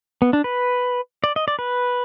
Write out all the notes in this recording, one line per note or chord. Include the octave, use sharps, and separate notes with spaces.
B3
D4
B4
D5
D#5
D5
B4